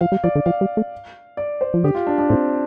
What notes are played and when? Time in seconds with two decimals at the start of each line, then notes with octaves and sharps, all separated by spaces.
0.01 F3 F5
0.12 G3
0.24 F3 D5
0.35 D3
0.46 F3 F5
0.61 G3
0.77 A3
1.37 D5
1.61 C5
1.74 F3
1.84 D3 G4
1.95 F4
2.07 D4
2.18 D4
2.29 A2 C4